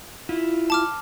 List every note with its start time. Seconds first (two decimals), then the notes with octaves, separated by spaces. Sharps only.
0.29 E4 F4
0.70 A5 D6 F6